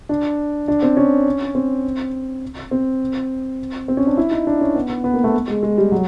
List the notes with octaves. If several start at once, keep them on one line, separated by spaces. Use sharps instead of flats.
D4
D4
C4
C#4
C4
C4
C4
C#4
D4
E4
D#4
D4
C#4
B3
B3
B3
A#3
A3
G#3
G#3
G3
F#3